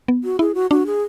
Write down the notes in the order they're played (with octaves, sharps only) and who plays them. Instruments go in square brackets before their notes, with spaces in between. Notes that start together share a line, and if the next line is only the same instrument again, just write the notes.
[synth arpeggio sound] B3
[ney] F#4
[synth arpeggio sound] E4 [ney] G#4
[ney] F#4
[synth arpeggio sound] D4 [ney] F#4
[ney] G#4